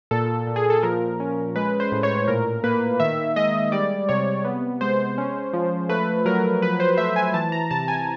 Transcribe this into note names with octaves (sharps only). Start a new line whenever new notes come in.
A#2 A4
A#2
G#4
A4
F3 A#4
C#4
G#3 B4
C5
A2
C#5
A#2 A#4
A#3 B4
D#3 E5
G#3 D#5
G3 D5
C3 C#5
B3
G#3 C5
C#4
F3
A3 B4
F#3 A#4
F3 B4
C5
A3 E5
G#5
E3 A5
A#5
C3 A5
G#5